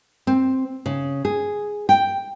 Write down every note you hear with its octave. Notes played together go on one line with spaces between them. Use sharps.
C4
C#3
G#4
G5